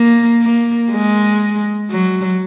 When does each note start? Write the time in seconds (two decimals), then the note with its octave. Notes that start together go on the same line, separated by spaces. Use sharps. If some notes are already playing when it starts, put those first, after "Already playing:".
Already playing: A#3
0.42 A#3
0.91 G#3
1.91 F#3